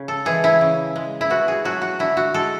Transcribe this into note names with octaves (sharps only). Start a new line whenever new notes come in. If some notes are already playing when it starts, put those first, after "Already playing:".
Already playing: C#3
A4
E3 G#3 G#4
E4
C#3
G#3
E4
B2 F#4
G#4
F#3 A3 F#4
F#4
D3 E4
F#4
G#3 A4